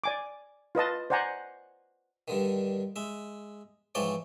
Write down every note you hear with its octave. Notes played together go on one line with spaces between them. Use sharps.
D5 G#5 D6
F4 B4 D#5 A5
C5 D5 F#5 G#5 A#5
G2 D3 D#3
G#3 E5
G#2 E3 F3 C#5 D5 G5